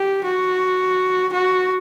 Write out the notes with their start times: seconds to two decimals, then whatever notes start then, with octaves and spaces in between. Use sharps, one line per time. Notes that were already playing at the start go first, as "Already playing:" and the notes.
Already playing: G4
0.24 F#4
1.33 F#4